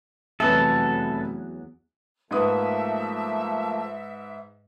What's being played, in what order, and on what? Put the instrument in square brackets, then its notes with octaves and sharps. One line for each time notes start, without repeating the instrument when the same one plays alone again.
[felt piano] F1 B4 E5 [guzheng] E2 F#3 [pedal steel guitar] A4
[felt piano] G#2 B4 D#6 [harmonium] F3 A3 A#3 [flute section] E5